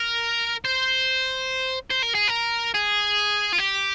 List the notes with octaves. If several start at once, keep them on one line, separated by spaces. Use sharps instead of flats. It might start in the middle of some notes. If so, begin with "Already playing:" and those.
Already playing: A#4
C5
C5
A#4
G#4
A#4
G#4
F4
G4